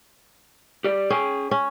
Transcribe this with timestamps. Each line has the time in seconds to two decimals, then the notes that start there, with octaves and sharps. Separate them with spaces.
0.84 G4 D5
1.10 C#4 G#4 G5
1.51 C#4